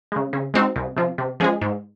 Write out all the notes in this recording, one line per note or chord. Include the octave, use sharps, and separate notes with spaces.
C#3 G#3
C#3
G#3 C4 D#4 F#4
C2
C3 F3
C3
F3 G#3 C#4 G#4
G#2